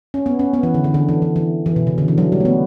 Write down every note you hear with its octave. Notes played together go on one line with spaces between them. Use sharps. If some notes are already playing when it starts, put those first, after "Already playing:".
C#4
B3
C#4
B3
E3
D3
D3
D3
E3
E3
E3
E3
B2
C#3
D3
E3
F#3
G3
A3
B3